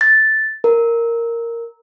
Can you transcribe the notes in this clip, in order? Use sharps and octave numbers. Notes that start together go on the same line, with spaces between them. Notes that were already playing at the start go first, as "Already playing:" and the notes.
A6
A#4